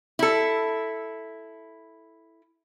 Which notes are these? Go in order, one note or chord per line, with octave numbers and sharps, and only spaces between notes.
E4 A4